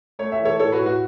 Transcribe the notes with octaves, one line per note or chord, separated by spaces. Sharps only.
A3 C#5
E5
E3
A4 C#5
A2 A4 C#5
F#4 B4
A2
F#4